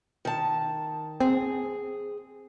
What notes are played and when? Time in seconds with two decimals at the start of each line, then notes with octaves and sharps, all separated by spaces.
0.25 D#3 A5
1.20 C4 G#4